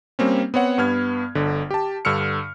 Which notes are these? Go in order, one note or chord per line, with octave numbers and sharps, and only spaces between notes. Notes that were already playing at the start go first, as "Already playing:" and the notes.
G3 A#3 C4 C#4
B3 C4 C#5 F#5
G2 B3 F6 G#6
G1 D3
G4 A5
G2 D3 E6 F6 C#7